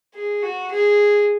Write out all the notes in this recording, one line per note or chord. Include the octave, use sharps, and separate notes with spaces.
G#4
F#4
G#4